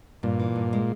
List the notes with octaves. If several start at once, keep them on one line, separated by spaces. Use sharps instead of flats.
G2 A#2
E3
G2
G#3